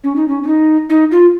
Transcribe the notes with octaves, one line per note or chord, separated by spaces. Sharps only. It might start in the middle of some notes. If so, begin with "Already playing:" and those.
C#4
D#4
C#4
C#4
D#4
D#4
F4